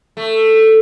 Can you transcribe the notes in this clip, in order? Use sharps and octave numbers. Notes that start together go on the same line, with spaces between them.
A3